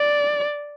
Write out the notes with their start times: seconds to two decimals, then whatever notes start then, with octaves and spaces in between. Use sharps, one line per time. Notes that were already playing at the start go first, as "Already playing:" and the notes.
Already playing: D5